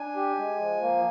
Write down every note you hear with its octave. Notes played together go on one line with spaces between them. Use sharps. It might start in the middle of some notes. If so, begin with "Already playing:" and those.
Already playing: D4 G#5
G4
G#3
F3
A#3